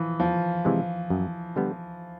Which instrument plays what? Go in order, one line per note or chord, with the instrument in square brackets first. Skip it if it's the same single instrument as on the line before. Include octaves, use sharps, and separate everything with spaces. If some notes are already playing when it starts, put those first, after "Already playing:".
Already playing: [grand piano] E3 F3
[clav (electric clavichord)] E2 [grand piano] F3
[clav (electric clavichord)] C3 E3 G#3
F#2
D3 G3 B3